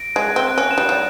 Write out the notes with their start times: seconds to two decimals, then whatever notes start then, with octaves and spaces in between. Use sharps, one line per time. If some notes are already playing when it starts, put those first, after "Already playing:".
Already playing: A#6 D7
0.16 G#3 F#6
0.36 C4
0.43 F#6
0.58 C#4
0.71 E7
0.78 G3
0.89 G3